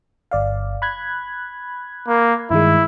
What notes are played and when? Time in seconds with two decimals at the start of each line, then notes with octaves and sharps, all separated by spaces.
0.31 G1 D5 F5
0.82 B5 F#6 G#6
2.08 A#3
2.51 G2 D#3 G#3 E4